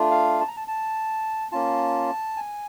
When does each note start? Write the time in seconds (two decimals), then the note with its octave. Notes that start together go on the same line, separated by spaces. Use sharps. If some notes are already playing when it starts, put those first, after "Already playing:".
Already playing: A3 D4 F4
0.11 F5
0.40 A5
0.48 A#5
0.57 A5
0.68 A5
1.52 A#3 C#4 F4 A5
2.37 G#5